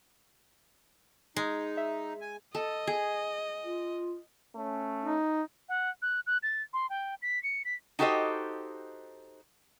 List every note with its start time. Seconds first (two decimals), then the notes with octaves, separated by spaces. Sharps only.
1.36 G#3 D#4
1.77 E5
2.21 G#5
2.55 A4 D#5
2.87 G#4
3.64 F4
4.54 A3 C#4
5.05 D#4
5.69 F#5
6.02 F#6
6.27 F#6
6.43 A6
6.73 C6
6.90 G5
7.22 B6
7.43 C#7
7.65 B6
7.99 D#4 F#4 G4 A4 C5 D#5